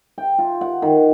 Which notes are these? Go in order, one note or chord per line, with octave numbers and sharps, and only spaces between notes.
G5
F4
F#5
D#3